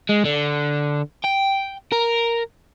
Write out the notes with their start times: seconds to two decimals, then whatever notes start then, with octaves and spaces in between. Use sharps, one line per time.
0.09 G#3
0.25 D3
1.24 G5
1.92 A#4